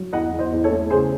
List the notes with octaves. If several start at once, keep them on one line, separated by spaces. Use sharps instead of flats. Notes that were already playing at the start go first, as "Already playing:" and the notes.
Already playing: F#3
E2 D#5 F#5
E2
C5 D#5
E2
A4 C#5
A3
C#3 G#4 C5